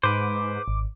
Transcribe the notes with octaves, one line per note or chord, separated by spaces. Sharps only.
G#2 B4 C5 D6
G#1